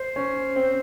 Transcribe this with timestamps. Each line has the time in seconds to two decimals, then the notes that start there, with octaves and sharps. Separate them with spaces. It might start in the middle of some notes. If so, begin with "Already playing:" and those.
Already playing: C5
0.16 C#4
0.56 C4